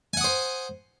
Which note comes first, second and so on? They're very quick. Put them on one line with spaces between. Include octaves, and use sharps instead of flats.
G#5 F#5 D#6 C5